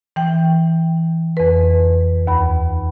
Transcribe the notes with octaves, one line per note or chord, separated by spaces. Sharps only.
E3 G5
F2 B4
D#2 B5